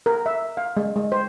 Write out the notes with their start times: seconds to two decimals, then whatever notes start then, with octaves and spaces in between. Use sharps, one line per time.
0.06 A#4
0.26 E5
0.57 F5
0.77 G#3
0.96 G#3
1.12 C5